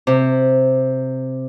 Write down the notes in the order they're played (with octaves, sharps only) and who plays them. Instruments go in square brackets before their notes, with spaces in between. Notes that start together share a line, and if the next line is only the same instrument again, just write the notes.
[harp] C3